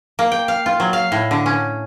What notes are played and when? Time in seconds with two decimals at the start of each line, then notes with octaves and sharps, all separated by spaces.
0.19 A#3
0.32 G5
0.48 F5
0.66 F4
0.80 F#3
0.93 F5
1.12 A2
1.31 D3
1.46 C#4